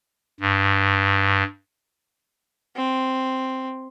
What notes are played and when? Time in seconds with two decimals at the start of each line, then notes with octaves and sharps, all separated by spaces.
0.40 G2
2.76 C4